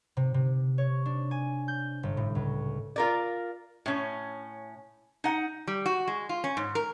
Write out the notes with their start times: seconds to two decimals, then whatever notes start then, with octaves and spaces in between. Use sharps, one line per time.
0.17 C3
0.34 C3
0.78 C#5
1.06 D4
1.31 G#5
1.68 G6
2.03 G1
2.17 A2
2.35 C#2
2.96 F4 A#4 D5
3.86 A2 C#4
5.24 D#4 F#5
5.68 G3
5.86 F#4
6.08 G#3
6.29 F4
6.44 C#4
6.57 G#2
6.75 A#4